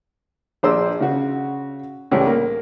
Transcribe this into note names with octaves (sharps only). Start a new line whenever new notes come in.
A#1 D4 G#4 C5 D5 E6
C#3 F#4
C#2 A2 E3 G3 C#4
A#3